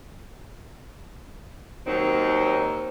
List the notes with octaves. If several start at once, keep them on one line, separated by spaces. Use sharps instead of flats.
D#2 D#3 F#3 C4 D#4